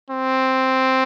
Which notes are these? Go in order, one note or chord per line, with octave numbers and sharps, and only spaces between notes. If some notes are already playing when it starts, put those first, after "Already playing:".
C4